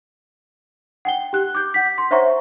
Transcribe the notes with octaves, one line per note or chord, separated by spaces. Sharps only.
F#5 G5 G7
G4 F#6
D6 G6
F#5 B6
C6
C5 C#5 E5 F#5 A#5 C#6